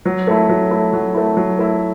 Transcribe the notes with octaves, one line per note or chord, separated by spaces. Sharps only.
F#3
A3 E4
F#3
A3 E4
F#3
A3 E4
F#3
A3 E4